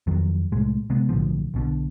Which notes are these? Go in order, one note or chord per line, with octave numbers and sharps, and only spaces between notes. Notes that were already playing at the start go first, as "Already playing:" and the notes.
F2 D#3 F#3
C2 A2 G#3
C3 G#3 B3
B1 A2 D3 F3
B1 B2 D3